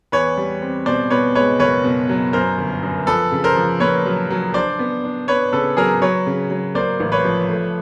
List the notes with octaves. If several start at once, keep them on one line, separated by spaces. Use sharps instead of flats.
E2 B4 C#5
G3
C4
B2 C5 D5
B2 B4 C#5
G#3 B4 C#5
F#1 B4 C#5
B2
F#3
F#2 A#4 C5
G1
F#2
F3 A4 B4
C#3
A#4 C5
F3
A#2 B4 C#5
F#3
F#3
D4 C5 D5
B3
D4
B3 B4 C#5
C#3 A4 B4
F#3 G#4 A#4
F#3 B4 C#5
C#3
F#3
A#3 C5 D5
A1
B4 C#5
F3
A3